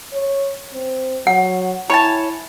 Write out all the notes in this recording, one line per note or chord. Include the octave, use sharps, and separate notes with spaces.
C#5
C4
F#3 F#5
E4 C#5 G#5 A5 B5